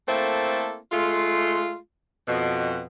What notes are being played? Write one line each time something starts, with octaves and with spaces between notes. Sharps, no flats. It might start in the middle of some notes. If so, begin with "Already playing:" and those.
A3 A#3 C4 E4 A4
G#3 A3 F4
F2 B2